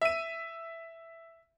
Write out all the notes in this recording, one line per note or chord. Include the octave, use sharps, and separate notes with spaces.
E5 D#7